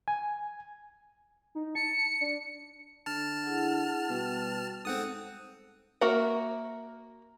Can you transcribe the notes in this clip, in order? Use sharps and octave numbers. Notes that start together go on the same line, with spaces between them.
G#5
D#4
A5 C#7
D4
D3 A5 F6
E4 G#4 F#5
B2 G3 F#4
G#2 C4 A4 F#5 D#6
A#3 F#4 A#4 E5 F#5